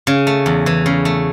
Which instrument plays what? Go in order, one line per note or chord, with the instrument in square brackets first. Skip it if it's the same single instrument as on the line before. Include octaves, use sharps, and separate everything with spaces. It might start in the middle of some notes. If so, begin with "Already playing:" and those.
[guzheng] C#3
A3
E2
E3
C#3
A3